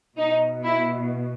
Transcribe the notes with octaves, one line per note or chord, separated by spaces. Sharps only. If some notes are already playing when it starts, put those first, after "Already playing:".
B2 D#4
E4